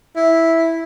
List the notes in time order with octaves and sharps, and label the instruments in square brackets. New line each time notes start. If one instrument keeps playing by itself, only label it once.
[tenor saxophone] E4